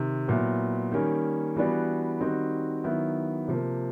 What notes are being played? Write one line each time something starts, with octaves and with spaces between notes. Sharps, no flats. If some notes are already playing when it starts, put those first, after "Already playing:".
Already playing: C3 D#3
A#2 F#3 B3 E4
D#3 G3 A#3 C#4
E3 G3 B3 D4 F#4
D#3 G3 C4 D#4 F#4
D#3 F#3 B3 E4
C3 F3 A#3